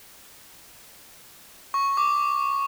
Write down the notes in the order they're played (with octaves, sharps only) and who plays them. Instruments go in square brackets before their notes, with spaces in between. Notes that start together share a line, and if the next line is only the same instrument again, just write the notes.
[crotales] C#6
D6